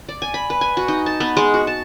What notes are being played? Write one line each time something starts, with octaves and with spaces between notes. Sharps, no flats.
D5
G#5
B5
B4
G#5
F#4
D#4
A5
B3
G#3
F#4
A5